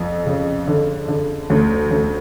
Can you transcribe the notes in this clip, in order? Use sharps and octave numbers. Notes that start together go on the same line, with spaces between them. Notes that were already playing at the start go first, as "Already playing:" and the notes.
Already playing: F2
C#3
D3
D3
D2
D2